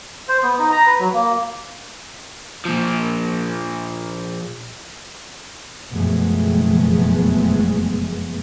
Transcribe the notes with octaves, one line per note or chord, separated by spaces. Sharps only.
C5
B3
D#4
A#5
B4
F#3
A#3
A#2 F3
F#1 F2 B2 G#3 A3 B3